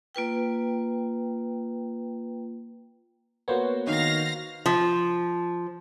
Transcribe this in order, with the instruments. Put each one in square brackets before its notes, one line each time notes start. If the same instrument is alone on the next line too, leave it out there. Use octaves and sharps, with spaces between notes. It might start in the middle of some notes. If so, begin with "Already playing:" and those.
[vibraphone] A#3 F4 B4 G5
[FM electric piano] A#3 B3 [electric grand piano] F#4 C5 C#5
[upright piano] D#3 [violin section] F5 F6 A#6
[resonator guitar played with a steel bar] F3